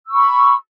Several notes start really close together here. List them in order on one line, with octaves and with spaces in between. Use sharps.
E6 C#6 B5